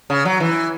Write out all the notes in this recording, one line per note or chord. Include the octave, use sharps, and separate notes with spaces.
C#3
F#3
E3